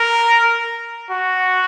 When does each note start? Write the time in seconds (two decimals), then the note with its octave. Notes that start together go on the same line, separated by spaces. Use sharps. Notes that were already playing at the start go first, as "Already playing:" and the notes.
Already playing: A#4
1.10 F#4